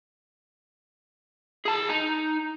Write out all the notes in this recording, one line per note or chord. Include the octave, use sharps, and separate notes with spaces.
G#4 A5
D#4